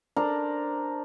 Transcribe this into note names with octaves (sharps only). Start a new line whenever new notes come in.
D4 A#4 C5 A#5